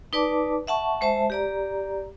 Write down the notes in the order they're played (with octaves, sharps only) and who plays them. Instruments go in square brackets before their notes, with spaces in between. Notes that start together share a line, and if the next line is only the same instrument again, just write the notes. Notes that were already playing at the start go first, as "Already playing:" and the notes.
[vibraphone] D#4 B4 D5 A5 D6
E5 F#5 A5 C#6
G#3 C5 E5 A5
G4 D5 A#5